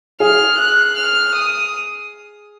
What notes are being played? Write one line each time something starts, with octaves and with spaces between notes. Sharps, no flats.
G#4 F6
F#6
F6
D#6